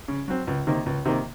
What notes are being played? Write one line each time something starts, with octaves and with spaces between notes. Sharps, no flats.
C#3
F#3 C4
C#2
C3 D#3 A#3
C#2
C3 D#3 A#3